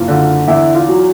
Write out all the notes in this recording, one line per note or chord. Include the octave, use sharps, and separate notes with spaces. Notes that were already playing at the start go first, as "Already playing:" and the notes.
Already playing: F#1 F4
D3
E2 E4
F4
F#3